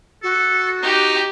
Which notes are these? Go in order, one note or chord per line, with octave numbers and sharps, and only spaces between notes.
F#4 A4
D#4 G4